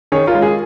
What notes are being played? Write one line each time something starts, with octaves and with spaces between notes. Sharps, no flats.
D#3 G#4 C#5
F4 A#4
G#3
G#4